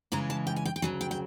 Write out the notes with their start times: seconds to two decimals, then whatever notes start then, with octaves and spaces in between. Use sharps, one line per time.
0.12 C#3 E3 G#3 C#4 A#5
0.30 A5
0.47 G5
0.56 G#5
0.65 G5
0.76 G5
0.82 D2 C#3 F#3 G#5
1.01 G5
1.11 G5